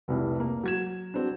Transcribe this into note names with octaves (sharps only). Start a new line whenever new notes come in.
F1 C2 E4
A#3
F#3 G#6 E7
F#3 C4 D4